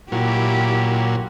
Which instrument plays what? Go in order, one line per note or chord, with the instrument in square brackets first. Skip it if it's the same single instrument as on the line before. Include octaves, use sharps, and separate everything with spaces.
[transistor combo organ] A#2 F#3 [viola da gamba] E4 G4